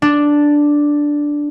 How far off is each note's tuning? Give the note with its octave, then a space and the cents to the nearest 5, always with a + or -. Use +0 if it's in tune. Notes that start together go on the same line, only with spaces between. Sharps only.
D4 +0